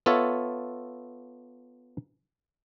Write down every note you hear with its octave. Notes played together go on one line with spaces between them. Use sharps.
B3 F4 A4 C#5 E5